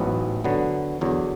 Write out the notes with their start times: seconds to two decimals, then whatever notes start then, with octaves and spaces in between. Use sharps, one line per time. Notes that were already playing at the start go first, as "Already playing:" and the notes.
Already playing: A1 G#2 F#3 B3
0.44 D3 F#3 B3
1.01 E2 D3 F#3